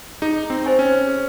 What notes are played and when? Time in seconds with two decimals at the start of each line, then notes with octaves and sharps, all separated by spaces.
0.22 D#4 G#4
0.50 C4
0.64 C5 D#5 G#5 C#6
0.79 C#4
1.07 G#4